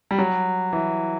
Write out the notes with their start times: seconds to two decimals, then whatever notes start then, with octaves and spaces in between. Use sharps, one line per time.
0.11 G3
0.19 F#3
0.73 E3